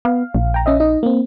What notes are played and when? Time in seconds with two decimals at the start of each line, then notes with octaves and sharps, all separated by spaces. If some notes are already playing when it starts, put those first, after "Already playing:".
0.05 B3 F5
0.34 A#1
0.54 G5 A#5
0.66 C#4 D#5 E5
0.80 D#4 D#5
1.03 A#3 C4